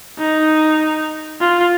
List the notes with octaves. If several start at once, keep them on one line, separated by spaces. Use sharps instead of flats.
D#4
F4